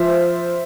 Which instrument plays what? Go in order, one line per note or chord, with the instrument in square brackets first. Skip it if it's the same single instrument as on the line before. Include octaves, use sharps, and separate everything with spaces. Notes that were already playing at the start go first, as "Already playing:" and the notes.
Already playing: [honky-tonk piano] F3 C5 E5